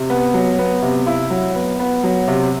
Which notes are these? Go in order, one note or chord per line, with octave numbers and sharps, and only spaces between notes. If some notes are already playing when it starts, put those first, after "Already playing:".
Already playing: C3
B3
F#3
B3
C3
E4
F#3
B3
B3
F#3
C3